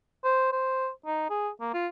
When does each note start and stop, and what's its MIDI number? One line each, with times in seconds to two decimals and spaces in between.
0.24 0.49 72
0.52 0.89 72
1.06 1.29 63
1.30 1.49 68
1.60 1.69 58
1.74 1.87 65